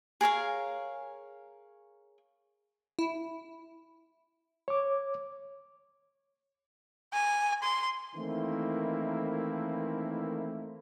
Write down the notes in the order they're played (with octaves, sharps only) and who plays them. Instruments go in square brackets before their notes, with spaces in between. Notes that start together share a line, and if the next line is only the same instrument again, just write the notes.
[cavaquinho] G#4 A#4 C#5 F5
[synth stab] E4
[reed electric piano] C#5 D6
[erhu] G#5
C6
[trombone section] D#3 E3 A3 A#3 C4 E4